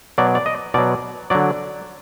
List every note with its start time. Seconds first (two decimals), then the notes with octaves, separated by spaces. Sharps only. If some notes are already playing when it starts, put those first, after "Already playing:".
0.18 B2 F#3 D5
0.35 D5
0.46 D#5
0.74 B2 F#3 D5
1.30 D3 F#3 D5